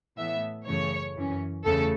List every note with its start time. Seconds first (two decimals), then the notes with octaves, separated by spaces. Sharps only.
0.18 A2 E3 B3 E5
0.67 F#2 C#3 E3 A3 C#5
1.16 F#2 E3 C#4
1.64 E2 C#3 A3 A4